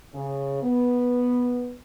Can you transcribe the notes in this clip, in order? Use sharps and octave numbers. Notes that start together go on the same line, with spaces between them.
C#3
B3